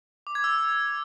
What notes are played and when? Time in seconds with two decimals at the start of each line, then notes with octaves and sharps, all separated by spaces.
0.27 D6
0.35 G#6
0.44 E6